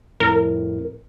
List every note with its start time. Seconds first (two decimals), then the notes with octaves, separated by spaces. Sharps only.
0.20 F2 A2 A#4